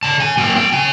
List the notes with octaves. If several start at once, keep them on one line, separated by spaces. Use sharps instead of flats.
C#3 A5
G#5
F#3 A#3 G5
G5
C#3 G#5